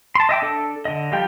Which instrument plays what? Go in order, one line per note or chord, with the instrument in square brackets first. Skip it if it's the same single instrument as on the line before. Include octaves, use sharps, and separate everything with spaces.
[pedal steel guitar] A5 C6
D#5 E5 G5 D6
D4 A4
D3 D#5
F3 G3 F4 G4 G5